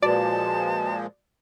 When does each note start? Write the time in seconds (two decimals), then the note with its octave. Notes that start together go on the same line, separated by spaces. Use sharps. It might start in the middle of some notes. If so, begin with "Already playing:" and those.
0.02 A#2 F3 G#3 F#4 B4 D5 A5